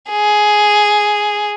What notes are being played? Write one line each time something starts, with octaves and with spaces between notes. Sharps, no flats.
G#4